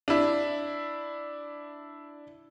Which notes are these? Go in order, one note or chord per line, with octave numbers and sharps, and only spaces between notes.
D4 E4